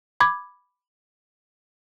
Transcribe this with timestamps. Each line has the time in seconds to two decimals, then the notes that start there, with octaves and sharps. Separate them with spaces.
0.20 B5 D6 G#6